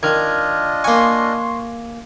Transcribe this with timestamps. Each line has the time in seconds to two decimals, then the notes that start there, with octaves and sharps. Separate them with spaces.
0.03 D#3 D4 F4 D#5 F6 G#6
0.84 A#3 G#5 C6 C#6